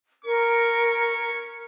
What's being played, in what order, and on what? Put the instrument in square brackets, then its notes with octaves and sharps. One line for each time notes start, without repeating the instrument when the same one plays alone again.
[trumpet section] C#4 C#6 [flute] A#4